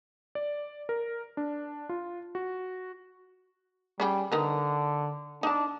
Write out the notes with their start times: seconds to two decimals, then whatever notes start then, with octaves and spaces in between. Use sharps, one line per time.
0.35 D5
0.89 A#4
1.37 D4
1.89 F4
2.35 F#4
4.00 G3 C#4 G#4 G5
4.32 D3 D#4 A#4 B4
5.43 D4 D#4 A5